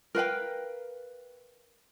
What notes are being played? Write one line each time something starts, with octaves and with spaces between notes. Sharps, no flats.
A#4 B4 F5 G5